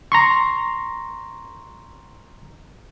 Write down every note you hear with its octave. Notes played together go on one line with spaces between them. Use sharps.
A#5 C6 C#6